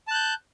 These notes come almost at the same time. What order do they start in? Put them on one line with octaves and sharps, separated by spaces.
A5 F#6 G6